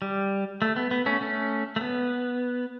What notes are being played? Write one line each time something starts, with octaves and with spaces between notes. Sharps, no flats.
G3
A3
B3
B3
A3 C#4
A3 C#4
A3
B3